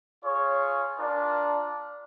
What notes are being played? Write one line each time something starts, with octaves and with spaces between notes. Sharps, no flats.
F4 G#4 C#5
D4 F4 A#4 D5